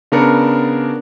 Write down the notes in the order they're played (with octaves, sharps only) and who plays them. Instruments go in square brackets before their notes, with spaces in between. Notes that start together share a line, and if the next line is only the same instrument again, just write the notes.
[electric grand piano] C#3 B3 D4 A#4 D5 C#7